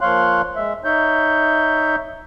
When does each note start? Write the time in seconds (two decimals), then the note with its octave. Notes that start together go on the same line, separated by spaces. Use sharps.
0.01 F3 A#3 C#5 F5 C6 F#6
0.56 G#3 E5
0.84 D#4 C#5 E5 G6